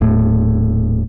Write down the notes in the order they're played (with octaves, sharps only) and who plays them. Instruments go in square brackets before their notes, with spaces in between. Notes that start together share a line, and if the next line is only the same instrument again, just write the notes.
[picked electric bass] D#1 A2